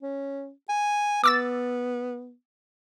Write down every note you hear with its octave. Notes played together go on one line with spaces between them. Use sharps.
C#4
G#5
B3 D6 E6 A6